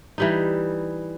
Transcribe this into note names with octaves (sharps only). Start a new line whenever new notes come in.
E3 G3 D#4